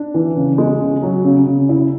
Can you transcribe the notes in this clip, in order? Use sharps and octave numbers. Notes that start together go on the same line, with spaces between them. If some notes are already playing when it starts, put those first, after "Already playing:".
Already playing: D4
E3
C#3
G#3
C#3
F#3
C#3
C#3
E4